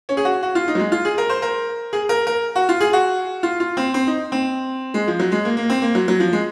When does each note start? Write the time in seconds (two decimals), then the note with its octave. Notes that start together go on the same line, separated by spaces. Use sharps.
0.09 C#4
0.17 G#4
0.25 F#4
0.43 F#4
0.55 F4
0.68 D#4
0.75 F#3
0.79 G#3
0.92 F4
1.05 G#4
1.18 A#4
1.30 C5
1.42 A#4
1.93 G#4
2.09 A#4
2.27 A#4
2.55 F#4
2.69 F4
2.81 G#4
2.93 F#4
3.43 F4
3.60 F4
3.77 C4
3.94 C4
4.07 D#4
4.32 C4
4.94 G#3
5.08 F3
5.20 F#3
5.32 G#3
5.45 A#3
5.57 A#3
5.70 C4
5.82 A#3
5.95 F#3
6.08 F#3
6.20 F3
6.33 G#3